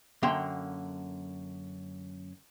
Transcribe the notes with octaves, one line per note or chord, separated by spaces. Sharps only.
F#2 D3 A#3 G5 C6